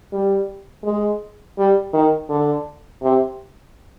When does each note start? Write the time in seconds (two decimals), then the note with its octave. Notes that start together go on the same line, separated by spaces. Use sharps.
0.13 G3
0.84 G#3
1.58 G3
1.93 D#3
2.29 D3
3.03 C3